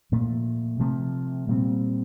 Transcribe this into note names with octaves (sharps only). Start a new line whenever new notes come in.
A#2 F3 A3
C3 F3 A3
A#2 G3 C4